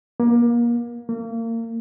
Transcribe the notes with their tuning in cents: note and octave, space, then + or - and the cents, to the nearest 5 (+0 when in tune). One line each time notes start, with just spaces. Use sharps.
A#3 +30
A#3 -30